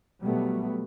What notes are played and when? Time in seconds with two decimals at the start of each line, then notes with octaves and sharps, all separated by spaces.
0.21 B2 F#3 G3 A3 B3